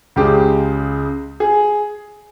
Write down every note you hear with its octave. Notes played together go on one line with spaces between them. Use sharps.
C#2 C#3 G#3 G4
G#4